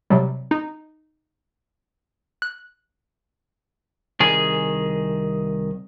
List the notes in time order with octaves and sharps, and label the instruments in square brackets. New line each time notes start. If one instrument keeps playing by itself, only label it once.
[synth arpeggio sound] C3 F#3 G3
D#4
F#6
[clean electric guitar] C2 D#3 G#4 G#5